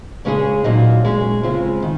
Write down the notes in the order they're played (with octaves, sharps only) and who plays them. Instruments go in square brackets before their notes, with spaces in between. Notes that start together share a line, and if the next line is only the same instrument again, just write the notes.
[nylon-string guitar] C#3 G#3 C#4 G#4
A#2 F#3 A#3 D#4
G#3 C#4 G#4
C#3 G#3 C4 F4
D#3